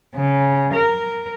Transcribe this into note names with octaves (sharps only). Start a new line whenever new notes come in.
C#3
A#4